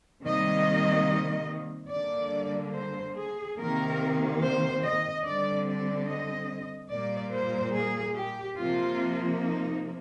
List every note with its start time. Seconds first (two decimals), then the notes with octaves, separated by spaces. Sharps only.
0.24 C3 D#3 G3 A#3 D#5
1.91 D3 G3 A#3 D5
2.74 C5
3.16 G#4
3.58 C3 D#3 A#3 A#4
4.42 C5
4.83 D#5
5.25 D3 G3 C4 D5
5.66 D5
6.08 D#5
6.92 A#2 G3 A#3 D5
7.33 C5
7.76 G#4
8.17 G4
8.59 C3 F3 A#3 F4
9.43 D#4